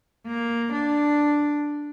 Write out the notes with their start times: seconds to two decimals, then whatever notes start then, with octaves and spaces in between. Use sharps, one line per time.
0.27 A#3
0.73 D4